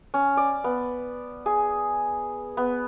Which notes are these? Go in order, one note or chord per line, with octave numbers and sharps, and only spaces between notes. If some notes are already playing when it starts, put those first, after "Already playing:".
C#4
D5
B3
G#4
B3